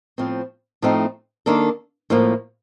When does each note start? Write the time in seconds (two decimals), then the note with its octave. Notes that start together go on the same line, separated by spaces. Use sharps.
0.18 A2 F3 C4
0.82 A2 F3 A3 C4 D#4
1.46 D#3 A#3 D4 A4
2.10 A2 F3 A#3